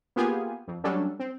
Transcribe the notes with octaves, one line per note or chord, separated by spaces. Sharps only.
A#3 B3 F4 G4 G#4 G#5
F2
F#3 G3 A3 C#4 D4 A4
C4